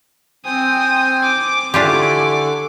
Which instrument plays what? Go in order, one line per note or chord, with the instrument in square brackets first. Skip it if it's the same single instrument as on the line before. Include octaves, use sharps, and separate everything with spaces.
[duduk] C4 [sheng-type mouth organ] C5 G5 G#5 [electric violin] D#6
[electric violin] D6
[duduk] D3 [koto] D4 F4 G4 [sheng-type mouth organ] E4 G#5 C#6